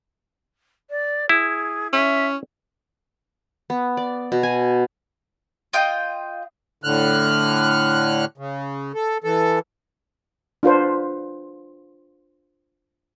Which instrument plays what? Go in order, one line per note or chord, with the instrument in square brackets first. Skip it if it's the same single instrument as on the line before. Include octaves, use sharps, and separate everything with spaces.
[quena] D5
[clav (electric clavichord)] E4 [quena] G#4
[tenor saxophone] C#4 [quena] E5
[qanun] B3
D5
B2
G#5
[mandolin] F4 D#5 G5
[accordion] A2 D3 F6 F#6
C#3
A4
E3 A4
[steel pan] D4 F4 B4 C5